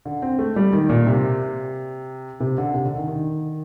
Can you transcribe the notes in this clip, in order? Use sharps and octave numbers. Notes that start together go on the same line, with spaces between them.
D3
C4
A3
G3
D#3
A#2
C3
C3
D3
C3
D3
D#3
D#3